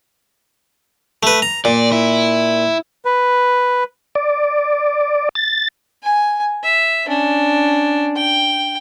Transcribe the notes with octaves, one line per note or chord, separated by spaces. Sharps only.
A3 B4
A#5
A#2 D5
E4
B4
D5
A6
G#5
E5
C#4 D4
G5